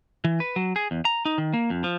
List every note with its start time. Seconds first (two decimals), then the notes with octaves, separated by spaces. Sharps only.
0.25 E3
0.40 B4
0.56 F#3
0.76 G#4
0.91 E2
1.05 A#5
1.25 D#4
1.38 D#3
1.53 A#3
1.70 F2
1.84 F3